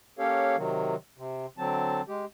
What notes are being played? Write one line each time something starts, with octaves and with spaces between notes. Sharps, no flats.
A#3 C#4 G4 A4 C#5 F5
C3 D#3 F#3
C3
D3 F#3 C4 A5
G#3 G4